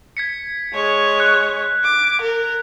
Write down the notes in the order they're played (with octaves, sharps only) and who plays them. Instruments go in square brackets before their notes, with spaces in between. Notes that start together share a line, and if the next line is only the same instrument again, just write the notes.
[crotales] G#6 B6 C#7
[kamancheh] G#3 C#5
[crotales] F#6
[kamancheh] D6
A#4